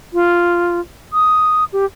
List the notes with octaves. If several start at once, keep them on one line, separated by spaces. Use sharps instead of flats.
F4
D#6
G4